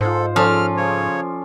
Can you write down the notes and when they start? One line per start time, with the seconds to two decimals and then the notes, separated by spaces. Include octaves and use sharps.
0.01 G#2 F4 A4 C5
0.36 F3 C#4 A4 D5 F6
0.77 C#3 C#5